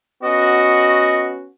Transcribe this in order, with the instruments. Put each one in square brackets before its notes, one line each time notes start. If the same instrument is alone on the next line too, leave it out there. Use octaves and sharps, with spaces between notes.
[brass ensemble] B3 C#4 F#4 [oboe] D#5